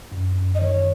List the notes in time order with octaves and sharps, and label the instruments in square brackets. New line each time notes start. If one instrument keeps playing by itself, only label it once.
[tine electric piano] F#2
F#2
[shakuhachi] D#5
[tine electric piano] D#3 [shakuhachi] C#5